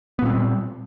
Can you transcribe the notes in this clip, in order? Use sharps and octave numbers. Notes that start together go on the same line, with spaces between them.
A#2 G3 B3 C4